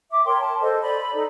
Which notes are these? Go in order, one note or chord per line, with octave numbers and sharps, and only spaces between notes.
E5 D6
A#4 C#5 G5 C6
A5
A4 C5 D#5
D5 B5
D#4 A4